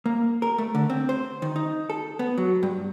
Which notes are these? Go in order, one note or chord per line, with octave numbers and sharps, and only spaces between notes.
A#3
A#4
A3
D3
C4
C5
D#3
D#4
A4
B3
F#3
G2